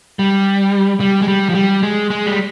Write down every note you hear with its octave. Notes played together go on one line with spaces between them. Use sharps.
G3
G3
G#3
G3
F3
G3
G#3
G#3
G3